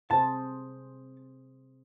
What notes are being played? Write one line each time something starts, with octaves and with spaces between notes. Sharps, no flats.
C3 G#4 C5 A5